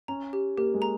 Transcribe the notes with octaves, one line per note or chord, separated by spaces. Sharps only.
C#4 A#5
G4
A#3 G4
G#3
A#5